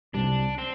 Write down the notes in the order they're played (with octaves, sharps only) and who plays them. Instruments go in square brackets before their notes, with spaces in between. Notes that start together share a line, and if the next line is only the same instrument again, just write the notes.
[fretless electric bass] C2 C3 G3 [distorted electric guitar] D4
[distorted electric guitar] C4